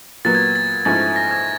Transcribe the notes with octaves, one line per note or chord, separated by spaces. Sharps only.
A#2 F#3 B3 A6
G#6
A6
G#2 F3 A3 C#4 E4 A6
A#6
G#6